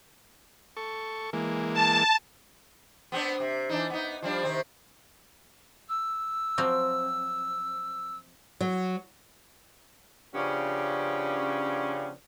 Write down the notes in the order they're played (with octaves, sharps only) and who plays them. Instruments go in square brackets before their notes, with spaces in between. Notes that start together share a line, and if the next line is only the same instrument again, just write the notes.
[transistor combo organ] A4 C#6
E3 G#3 A#3
[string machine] A5
[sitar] B3 C4 D4
C3
E3 D4 D#4
B3 D#4
F3 G3 D4
C3 D#3 C4
[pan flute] E6
[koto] F3 F#3 C4
[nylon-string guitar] F#3
[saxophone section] C#3 F3 B3 C#4 D4 G4